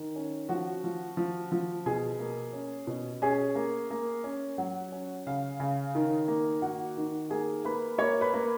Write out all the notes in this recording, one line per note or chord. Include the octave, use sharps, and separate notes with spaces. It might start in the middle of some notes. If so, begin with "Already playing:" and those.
Already playing: D#3
C#4
F3 F#4 F#5
F3
F3
F3
B2 G#4 G#5
A#3
C#4
B2
C#4 G#4 G#5
A#3
A#3
C#4
F#3 F#4 F#5
C#4
C#3 F5
C#3
D#3
A#3
D#3 F#4 F#5
D#3
A#3 G#4 G#5
A#3 B4 B5
A#3 C#5 C#6
B4 B5
A#3